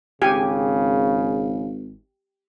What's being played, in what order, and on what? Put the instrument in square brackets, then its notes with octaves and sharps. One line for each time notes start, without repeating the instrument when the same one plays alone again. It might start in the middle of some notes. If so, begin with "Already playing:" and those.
[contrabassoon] G#1 [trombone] C#3 [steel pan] G4 G#5